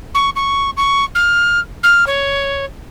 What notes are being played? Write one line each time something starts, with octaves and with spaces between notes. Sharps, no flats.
C#6
C#6
C#6
F6
F6
C#5